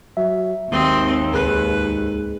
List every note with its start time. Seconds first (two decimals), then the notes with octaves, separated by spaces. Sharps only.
0.17 F#3 E5
0.71 G#1 D#2 C4 D#5
1.33 C#2 G#2 G#4 B4 F#6